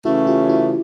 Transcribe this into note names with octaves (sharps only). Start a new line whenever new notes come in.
C#3 E3 A3 C#4 E4 F#4
F4 G4
E4 F#4